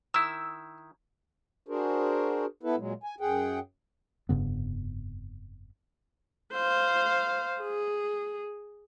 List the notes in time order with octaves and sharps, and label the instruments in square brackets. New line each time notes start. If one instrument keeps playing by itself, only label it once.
[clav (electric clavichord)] D#3 E4 [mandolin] E6
[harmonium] D4 F#4 G#4 A#4 C5
B3 E4 A4 B4
A#2 F#3 G#3
G#5
F#2 G#4 F#5 G5
[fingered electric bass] F1 G2 C#3 B3
[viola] C5 F5
G#4